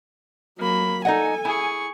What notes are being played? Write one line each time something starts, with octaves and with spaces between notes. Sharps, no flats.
F#3 A#3 B5
D#4 A4 D#5 F#5 G#5
E4 G#4 C#6